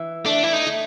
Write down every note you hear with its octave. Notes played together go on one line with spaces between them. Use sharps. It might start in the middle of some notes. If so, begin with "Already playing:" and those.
Already playing: E3
A3 D4
E4
D#4
A3